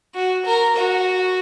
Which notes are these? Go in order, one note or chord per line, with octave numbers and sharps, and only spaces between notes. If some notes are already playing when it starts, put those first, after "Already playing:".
F#4
A#4
F#4